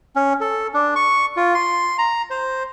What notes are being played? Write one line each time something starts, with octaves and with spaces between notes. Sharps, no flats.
C#4
A4
D4
C#6
F4
C6
A#5
C5